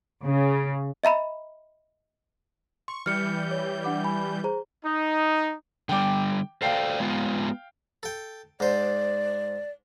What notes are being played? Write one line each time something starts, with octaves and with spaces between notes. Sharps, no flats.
C#3
D#5 E5 A#5 B5
C6 C#6
E3 G3 F6 G6 C#7
C#5
D4 F#5 D6
G#5 B5
G#4 C5 A#5
D#4
D3 G3 G5 D6
A4 C5 D5 F5 G5 C7
G#3 B3 F4
A4 G5
G#2 C5 D5